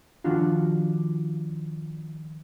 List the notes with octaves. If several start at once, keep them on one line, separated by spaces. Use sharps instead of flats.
D#3 F3 D4 F4 F#4